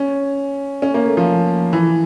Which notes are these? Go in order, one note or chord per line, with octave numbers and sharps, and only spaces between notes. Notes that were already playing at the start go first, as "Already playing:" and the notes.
Already playing: C#4
C#4
A#3
A3
F3
E3